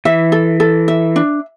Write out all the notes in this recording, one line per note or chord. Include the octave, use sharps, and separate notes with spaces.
E3 E5
A4
A4
E5
D4